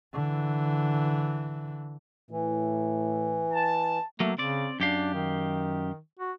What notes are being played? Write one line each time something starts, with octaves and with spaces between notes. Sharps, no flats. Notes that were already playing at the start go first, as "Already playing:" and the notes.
D3 E3
A2 E3
A5
F#3 A3 A#3
C#3 C4 D5
F#2 D4 G4 F5
D#3
F#4